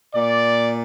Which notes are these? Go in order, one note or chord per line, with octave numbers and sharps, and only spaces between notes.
A#2 D5